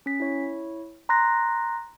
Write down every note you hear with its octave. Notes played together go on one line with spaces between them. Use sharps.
C#4 B6
E4 C#5
A#5 C6 F#6 A#6